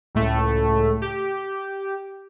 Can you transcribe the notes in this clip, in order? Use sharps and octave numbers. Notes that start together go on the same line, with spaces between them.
C#2 A2 A3
G4